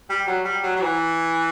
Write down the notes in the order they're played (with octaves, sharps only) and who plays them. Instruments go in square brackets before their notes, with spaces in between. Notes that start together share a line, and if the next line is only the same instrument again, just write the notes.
[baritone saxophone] G3
F#3
G3
F#3
F#3
E3